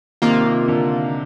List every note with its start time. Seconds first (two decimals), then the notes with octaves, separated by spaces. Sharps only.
0.22 C3 D#3 A#3 F4
0.45 C3
0.68 D3